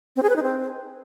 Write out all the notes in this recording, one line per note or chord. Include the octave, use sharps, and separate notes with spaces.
C4
G#4
B4
D#4
C4